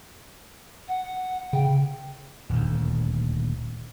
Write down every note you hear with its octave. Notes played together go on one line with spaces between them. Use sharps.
F#5
C#3 G5
D#1 D2